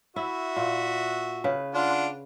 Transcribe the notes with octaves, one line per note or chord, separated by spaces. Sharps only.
E4 F#4 E5
A#2
C#3 B4
D4 F4 F#5